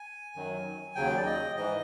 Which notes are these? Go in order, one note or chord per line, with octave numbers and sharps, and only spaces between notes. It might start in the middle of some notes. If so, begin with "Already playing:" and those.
Already playing: G#5
F#2 D#3 F#3
D#2 C#3 F#3 G5
D5
D#5
G#2 E3 D#5